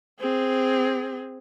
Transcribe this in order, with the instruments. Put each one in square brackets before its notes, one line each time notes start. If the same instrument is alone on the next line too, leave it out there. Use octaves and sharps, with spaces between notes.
[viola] C4 G#4